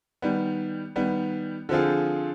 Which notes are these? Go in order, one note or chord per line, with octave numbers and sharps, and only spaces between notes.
D#3 G3 B3
D#3 G3 B3
D3 F3 C4 F4 G#4